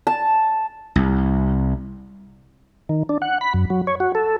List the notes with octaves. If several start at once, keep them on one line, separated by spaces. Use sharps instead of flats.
A5
C2
D#3
D4
F#5
B5
F#2
F#3
C#5
F#4
A4